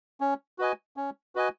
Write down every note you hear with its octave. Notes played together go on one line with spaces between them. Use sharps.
C#4
F#4 B4 D#5 G#5
C#4
F#4 B4 D#5 G#5